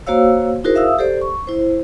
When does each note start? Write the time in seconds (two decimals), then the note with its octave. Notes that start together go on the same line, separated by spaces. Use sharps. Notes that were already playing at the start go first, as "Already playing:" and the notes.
0.07 A#3 F#4 C5 C#5 F5 E6
0.64 D#4 E4 F#4 G#4 A#4 C5
0.75 E5 F5 D#6 E6
0.99 G4 A4 C5 D5
1.22 C#6
1.47 E4 C5